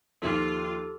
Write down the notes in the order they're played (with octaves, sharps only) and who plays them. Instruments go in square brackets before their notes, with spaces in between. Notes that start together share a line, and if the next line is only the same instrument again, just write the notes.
[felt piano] D#2 F3 [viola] F4 [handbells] G4 A4